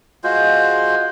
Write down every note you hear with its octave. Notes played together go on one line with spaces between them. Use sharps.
G#3 F4 F#4 C5